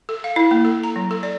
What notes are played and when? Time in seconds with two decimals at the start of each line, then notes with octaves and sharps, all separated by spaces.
0.09 A4
0.24 F5
0.36 E4
0.51 A#3
0.65 A4
0.84 A#5
0.96 F#3
1.11 A4
1.23 D5